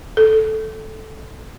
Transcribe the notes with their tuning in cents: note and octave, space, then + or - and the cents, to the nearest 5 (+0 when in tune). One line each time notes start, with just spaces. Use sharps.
A4 -5